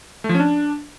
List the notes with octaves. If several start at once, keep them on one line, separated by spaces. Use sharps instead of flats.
A3
F3
C#4
D4